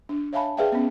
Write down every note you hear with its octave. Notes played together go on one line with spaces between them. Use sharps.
D4
C#5 E5 F5 G#5 A5 B5
G#4 B4 D5 E5 F5 G5
B3 C#4